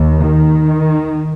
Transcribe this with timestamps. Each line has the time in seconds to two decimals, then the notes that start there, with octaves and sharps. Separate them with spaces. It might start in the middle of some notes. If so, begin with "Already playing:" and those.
Already playing: D#2
0.19 D#3